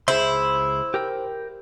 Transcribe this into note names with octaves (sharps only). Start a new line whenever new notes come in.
C#2 E4 G#4 C5 C6
G4 A#4 G5